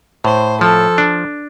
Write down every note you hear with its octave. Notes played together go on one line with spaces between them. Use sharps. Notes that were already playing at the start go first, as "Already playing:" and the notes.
A2 C5
F3 A4
D4